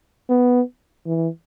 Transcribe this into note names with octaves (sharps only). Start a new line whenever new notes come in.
B3
E3